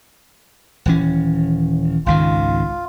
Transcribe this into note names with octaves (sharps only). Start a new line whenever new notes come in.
D#1 E3 C#4
G#1 C#2 D#3 F4